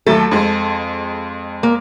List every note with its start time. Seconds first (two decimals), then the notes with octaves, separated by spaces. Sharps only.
0.06 D#2 F#3 A3 A4
0.31 F2 G#3
1.63 A#3